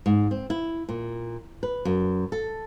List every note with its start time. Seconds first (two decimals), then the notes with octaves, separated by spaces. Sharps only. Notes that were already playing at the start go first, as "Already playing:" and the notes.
0.06 G#2
0.31 C4
0.50 E4
0.89 A#2
1.63 B4
1.85 F#2
2.32 A4